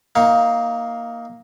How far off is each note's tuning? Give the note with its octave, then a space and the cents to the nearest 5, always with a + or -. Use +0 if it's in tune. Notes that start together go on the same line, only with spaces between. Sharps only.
A#3 +0 D#4 +20 F5 +0